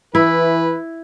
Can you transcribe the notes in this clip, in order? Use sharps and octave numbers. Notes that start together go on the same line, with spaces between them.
E3 E4 B4